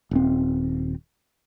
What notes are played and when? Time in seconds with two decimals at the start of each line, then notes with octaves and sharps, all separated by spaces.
0.11 D#1 C4